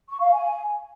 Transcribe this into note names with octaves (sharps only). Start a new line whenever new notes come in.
C#6
F5
G#5